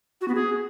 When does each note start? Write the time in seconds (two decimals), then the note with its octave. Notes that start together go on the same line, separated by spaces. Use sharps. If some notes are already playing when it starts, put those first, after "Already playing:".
0.21 F#4
0.28 B3
0.35 G#4